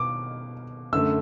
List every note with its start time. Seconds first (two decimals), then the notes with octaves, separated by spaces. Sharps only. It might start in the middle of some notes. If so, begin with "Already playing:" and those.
Already playing: B2 D6
0.92 F#2 D3 A3 E6